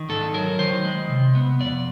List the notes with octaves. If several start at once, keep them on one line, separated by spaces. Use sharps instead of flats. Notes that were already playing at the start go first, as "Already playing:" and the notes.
Already playing: D#3
G#2 A4
F#3 A#4
D#3 C5
G#3
C3
B3
F2 D5